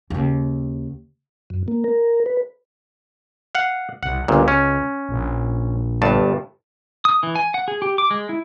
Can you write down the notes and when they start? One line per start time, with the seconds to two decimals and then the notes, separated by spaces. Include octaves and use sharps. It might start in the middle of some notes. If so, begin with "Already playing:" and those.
0.10 D#2 C#3
1.50 F#2
1.68 A#3
1.84 A#4
2.26 B4
3.55 F5 F#5
4.03 C2 F#5
4.28 G1 C#2 A#2
4.48 C#4
5.09 A#1
6.02 G1 G2 A5
7.05 D#6
7.23 E3
7.35 G#5
7.54 F#5
7.68 G#4
7.82 G4
7.98 D6
8.11 G#3
8.29 E4